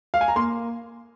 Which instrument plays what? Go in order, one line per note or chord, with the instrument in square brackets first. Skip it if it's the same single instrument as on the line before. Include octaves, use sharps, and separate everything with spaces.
[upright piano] F5
G#5
A#5
A#3 C6